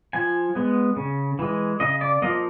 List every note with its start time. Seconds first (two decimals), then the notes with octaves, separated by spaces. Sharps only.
0.13 F3 G#5
0.55 G#3 B3
0.97 C#3
1.39 E3 G#3
1.80 C#3 D#5
2.01 D5
2.22 F3 A#3 D#5